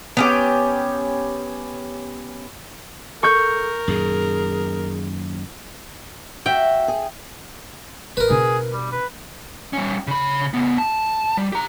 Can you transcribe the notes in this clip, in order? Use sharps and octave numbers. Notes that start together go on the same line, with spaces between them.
B3 C#4 G4
A4 A#4 C#6 G6
F#2 A#2 D#3 G#4
F#4 E5 G5
G#4
A1 A#4 B4
B2 D4 G#4
G3
B4
G3 C#4
C#3 B5
C#3 B3
A5
G3
G4 A#5